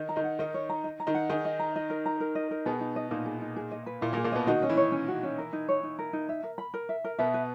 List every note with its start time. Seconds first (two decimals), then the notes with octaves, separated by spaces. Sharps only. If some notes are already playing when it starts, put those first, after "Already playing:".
Already playing: D#3 D#4
0.09 A#5
0.16 D#3 D#4
0.24 F#5
0.39 D#3 D#4 A#4
0.54 C#5
0.70 A#5
0.84 D#5
1.00 A#5
1.07 D#3 D#4
1.15 F#5
1.30 D#3 D#4 G#4
1.45 D#5
1.60 A#5
1.76 D#5
1.90 A#4
2.06 A#5
2.20 A#4
2.35 D#5
2.51 A#4
2.66 B2 B3 G#4
2.80 D#4
2.96 D#5
3.11 A#2 A#3 D#4
3.26 G#4
3.41 D#4
3.56 G#4
3.72 D#5
3.86 B4
4.01 A#2 A#3 E4
4.13 A#2 A#3
4.17 G#4
4.24 A#2 A#3
4.32 B2 B3 D#5
4.47 D#3 D#4 F#4
4.62 C#4
4.70 E3 E4
4.77 C#5
4.92 C#4
5.08 F#4
5.23 C#4
5.38 A#4
5.53 D#4
5.69 C#5
5.83 D#4
5.99 A#4
6.13 D#4
6.29 E5
6.44 A#4
6.58 B5
6.74 A#4
6.89 E5
7.04 A#4
7.19 B2 B3 E5
7.34 B4